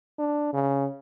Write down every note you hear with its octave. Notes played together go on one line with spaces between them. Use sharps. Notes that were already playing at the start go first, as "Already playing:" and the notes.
D4
C#3